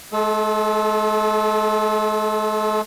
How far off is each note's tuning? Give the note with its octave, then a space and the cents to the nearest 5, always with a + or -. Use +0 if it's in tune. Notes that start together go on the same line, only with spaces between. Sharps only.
G#3 +40 A4 -20